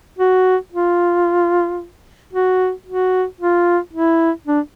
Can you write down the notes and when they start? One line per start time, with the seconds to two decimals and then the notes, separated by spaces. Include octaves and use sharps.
0.19 F#4
0.72 F4
2.33 F#4
2.87 F#4
3.41 F4
3.93 E4
4.47 D4